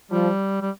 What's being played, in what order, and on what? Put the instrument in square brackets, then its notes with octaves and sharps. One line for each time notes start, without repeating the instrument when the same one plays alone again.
[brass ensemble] F3 [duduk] G3
[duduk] G3